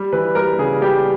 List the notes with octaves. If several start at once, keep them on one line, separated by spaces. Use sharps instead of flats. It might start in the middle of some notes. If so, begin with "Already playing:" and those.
Already playing: G3
E3 B4
G3 A#4
C#3 G#4
G3 G4